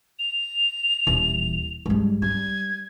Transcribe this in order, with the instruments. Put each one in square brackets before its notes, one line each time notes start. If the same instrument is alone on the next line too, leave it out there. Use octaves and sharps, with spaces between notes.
[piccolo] F7
[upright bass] D#1 E3
G#2 G3
[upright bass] G3 [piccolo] G#6